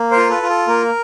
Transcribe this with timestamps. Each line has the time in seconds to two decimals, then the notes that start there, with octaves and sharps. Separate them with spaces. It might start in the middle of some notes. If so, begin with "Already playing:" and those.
Already playing: A#3
0.11 A#4 C5
0.16 F4
0.30 A4 B4
0.42 F4
0.49 A4
0.68 A#3 A#4